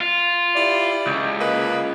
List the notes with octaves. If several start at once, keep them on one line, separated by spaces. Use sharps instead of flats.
F4
E4 G4 D5
C#2
A#3 B4 D#5